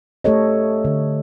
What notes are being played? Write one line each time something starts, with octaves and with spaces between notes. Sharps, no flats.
A3 G4 A4 C#5 D#5
D3